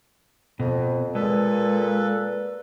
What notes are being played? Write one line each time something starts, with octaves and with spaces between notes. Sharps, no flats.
F2 B2
A#2 G#3 A4 B4